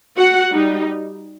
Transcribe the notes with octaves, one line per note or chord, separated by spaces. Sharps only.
F#4 F#5
G3 D#4